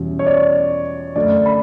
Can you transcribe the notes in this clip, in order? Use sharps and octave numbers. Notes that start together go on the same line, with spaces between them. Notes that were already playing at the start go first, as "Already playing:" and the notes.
Already playing: E2 B2 G3 C#4
C#5
D5
F#2 D3 A3 D4 D5
B5